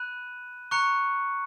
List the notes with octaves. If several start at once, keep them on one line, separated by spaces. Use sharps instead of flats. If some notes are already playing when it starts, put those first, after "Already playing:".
Already playing: B5 F#6 D#7
A#5 C#6 F#6 C#7